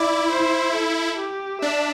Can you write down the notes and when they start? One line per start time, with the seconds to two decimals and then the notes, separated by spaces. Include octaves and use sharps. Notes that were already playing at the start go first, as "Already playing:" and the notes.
Already playing: E4 D5
0.31 C5
0.74 A4
1.18 G4
1.62 D4 E5